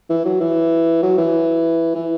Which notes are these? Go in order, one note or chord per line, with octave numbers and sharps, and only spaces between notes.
E3
F#3
E3
F#3
E3
E3